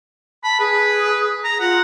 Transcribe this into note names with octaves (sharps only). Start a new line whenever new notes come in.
A5 B5
G#4 B4
A#5
F4 F#5